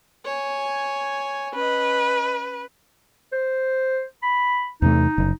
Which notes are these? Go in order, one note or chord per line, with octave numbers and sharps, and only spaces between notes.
C#5 G#5
C#4 B4 D#5
C5
B5
E2 C3 A3 D#4
F#1